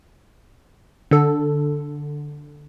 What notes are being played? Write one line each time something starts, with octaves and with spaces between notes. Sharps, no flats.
D3 A4